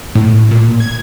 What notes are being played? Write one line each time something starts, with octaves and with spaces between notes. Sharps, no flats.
A2
A#2
G#6